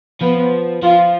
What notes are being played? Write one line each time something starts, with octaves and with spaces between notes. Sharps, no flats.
F3 B3
F3 F4